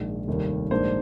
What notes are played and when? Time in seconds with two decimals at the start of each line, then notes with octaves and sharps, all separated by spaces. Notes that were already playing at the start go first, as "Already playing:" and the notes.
Already playing: A#1 G#2 D#3
0.28 F1 D#2 D#3 G3 A#3
0.71 A#1 G#2 D#3 A#3 D4 C5